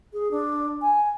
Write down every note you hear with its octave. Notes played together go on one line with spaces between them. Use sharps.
G#4
D4
G#5